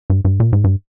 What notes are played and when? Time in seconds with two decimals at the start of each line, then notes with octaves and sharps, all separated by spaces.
0.10 G2
0.25 G2
0.40 A#2
0.53 G#2
0.64 G2